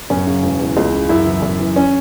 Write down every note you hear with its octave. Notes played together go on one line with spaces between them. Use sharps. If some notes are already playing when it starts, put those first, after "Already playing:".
F#2 C#4
C#3
E1
E2
C#2
C#3
F#2 E4
E3
F#2
E3
C#4